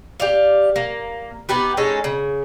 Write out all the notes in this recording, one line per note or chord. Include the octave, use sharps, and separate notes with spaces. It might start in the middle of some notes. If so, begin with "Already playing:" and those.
G4 D5 F5
A#3
B3 D#4 G4 B4
G#3 C#4 D#4 A4
C#3